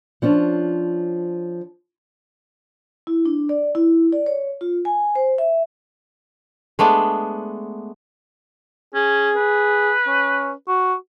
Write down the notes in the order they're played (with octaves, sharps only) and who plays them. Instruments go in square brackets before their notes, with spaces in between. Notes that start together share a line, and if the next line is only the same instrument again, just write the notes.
[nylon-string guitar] F3 C#4 D4
[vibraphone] E4
D4
D5
E4
D5
C#5
F4
G#5
C5
E5
[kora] G#3 A3 B3 D4
[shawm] C#4 [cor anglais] G#4
[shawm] B4
[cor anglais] C#4
F#4